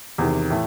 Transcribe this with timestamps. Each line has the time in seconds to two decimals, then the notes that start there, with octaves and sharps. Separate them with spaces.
0.18 E2 C3 D#3
0.50 A2 E3 A3